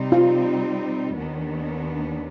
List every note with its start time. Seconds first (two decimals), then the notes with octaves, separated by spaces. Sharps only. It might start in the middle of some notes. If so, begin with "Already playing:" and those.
Already playing: C3 G3 C4 D#4
0.12 F4
1.17 D#2 D#3 B3 D4